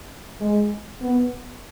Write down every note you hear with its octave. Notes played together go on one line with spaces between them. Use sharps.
G#3
B3